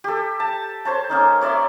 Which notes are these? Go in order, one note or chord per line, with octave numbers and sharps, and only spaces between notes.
G4 A4
A5
C5 C#5 A5
A#3 C#4 D#4
C#5 D5 E5 C6